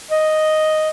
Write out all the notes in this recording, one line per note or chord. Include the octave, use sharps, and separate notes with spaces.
D#5